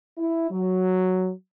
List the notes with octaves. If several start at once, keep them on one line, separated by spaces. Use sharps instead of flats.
E4
F#3